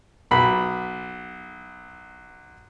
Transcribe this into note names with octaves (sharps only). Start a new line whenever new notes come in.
B1 B5